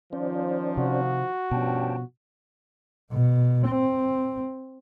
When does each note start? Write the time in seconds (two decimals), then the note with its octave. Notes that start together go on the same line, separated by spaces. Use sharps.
0.13 D#3 F3 C#4 C5 D5
0.77 C3 F#4
1.51 G2 B2 F3 C#4 G5 A5
3.12 B2
3.68 C4